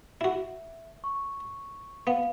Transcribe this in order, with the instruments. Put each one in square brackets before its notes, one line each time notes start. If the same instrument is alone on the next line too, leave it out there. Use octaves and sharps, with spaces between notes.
[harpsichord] E4 F#4 [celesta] E5
[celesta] C#6
[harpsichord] B3 [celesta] F5